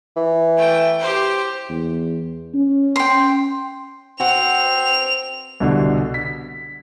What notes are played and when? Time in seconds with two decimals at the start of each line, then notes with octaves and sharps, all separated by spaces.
0.16 E3
0.57 A3 G5
0.99 G4 C5
1.69 E2
2.54 C#4
2.96 G5 C6
4.20 C4 F#4 F#5 F7
5.60 C2 B2 D3
6.14 B6